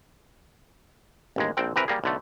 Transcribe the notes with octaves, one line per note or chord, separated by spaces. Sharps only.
A1 D#2 G#3
A#1 C4 G5
C3 E3 C4 A#4 B4
G3 A#3 G#4
B1 D3 A3